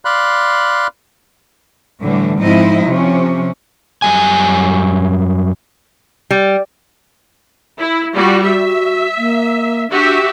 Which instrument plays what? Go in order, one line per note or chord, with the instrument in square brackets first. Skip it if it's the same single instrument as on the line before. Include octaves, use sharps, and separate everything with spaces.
[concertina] D5 F5 B5 C6 F#6
[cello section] A2 D3 E3 G3 A3
G#2 F3 C4 D#4 E4 D#5
C3 F3 C#4
[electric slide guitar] F#2 G3 G#5
[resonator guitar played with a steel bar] G3
[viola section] E4
[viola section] G3 F#4 [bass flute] F4
[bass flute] F#4 [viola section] E5
[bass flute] A#3
[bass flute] D4 [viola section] F#4 G4 E5